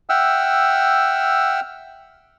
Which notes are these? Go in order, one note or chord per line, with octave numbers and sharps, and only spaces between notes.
E5 F#5 G5 E6 F6